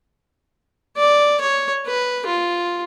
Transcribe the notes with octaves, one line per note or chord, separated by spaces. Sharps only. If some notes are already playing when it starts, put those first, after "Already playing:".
D5
C#5
B4
F4